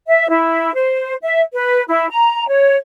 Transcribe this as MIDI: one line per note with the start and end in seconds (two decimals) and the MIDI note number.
0.07 0.28 76
0.30 0.73 64
0.74 1.14 72
1.23 1.41 76
1.53 1.83 71
1.88 2.09 64
2.10 2.46 82
2.49 2.76 73